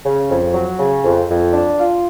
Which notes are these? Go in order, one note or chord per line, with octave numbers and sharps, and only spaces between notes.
C#3
F2
F#3
C#3
F2
F2
D4
F4